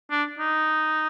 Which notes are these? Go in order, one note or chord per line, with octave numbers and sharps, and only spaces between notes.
D4
D#4